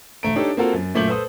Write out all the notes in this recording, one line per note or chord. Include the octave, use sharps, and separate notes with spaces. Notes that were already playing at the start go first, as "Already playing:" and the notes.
E1 A3 A#5 D7
D4 D#4 G4 A4 C#5
A#3 C4 F4 F#4 A4 A#4
F#2
F#2 A#2 A3 D6 G6 F#7
A4 B4 C5 D#6